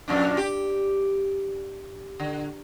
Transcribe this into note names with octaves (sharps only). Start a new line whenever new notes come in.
F2 A#2 D4
G4
D3